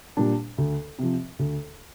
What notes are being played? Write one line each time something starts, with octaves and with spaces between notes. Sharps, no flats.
A#2 G3 D4
D2
C3 F3
D2